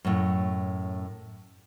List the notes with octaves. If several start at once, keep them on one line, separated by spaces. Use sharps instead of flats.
F#2 A2